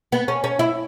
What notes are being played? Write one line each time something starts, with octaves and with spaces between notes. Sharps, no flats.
B3
C#4
C#4
E4